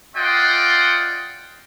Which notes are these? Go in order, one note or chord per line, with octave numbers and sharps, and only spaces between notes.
F4 D5 D#5 F#5 G5 C6